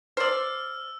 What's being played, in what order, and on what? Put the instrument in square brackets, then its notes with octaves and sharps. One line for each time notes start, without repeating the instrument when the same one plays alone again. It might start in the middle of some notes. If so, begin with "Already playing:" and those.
[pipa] C5 D5 [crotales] E6 F6